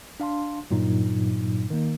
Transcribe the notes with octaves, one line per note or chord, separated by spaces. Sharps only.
D4 F5 A5 C6
G2 A#2 F#3 D#4
D#3 A#3